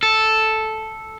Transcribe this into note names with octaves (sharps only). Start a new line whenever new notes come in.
A4